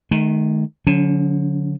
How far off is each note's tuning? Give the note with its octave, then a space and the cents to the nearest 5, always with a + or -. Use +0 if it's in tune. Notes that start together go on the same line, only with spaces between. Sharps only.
D#3 -10 A3 -45
D3 -15 F#3 -30 C#4 +30